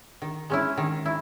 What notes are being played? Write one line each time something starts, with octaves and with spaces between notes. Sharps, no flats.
D#3
G#3 C#4 E4
D#3
E4